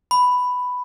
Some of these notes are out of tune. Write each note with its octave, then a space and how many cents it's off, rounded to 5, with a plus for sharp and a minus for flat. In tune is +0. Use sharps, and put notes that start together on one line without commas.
B5 +5